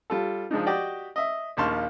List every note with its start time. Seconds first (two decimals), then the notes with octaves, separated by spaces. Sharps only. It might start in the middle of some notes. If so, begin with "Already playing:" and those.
0.10 G3 F4 A4
0.51 F3 G#3 D4 D#4
0.66 F#4 G4 D5 D#5 G5
1.16 D#5 E5
1.57 A#1 D#2 A5 C6 C#6 F6